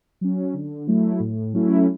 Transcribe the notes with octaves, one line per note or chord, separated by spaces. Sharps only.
F#3 C#4
D3
F#3 A3 E4
A2
F#3 A3 C#4 E4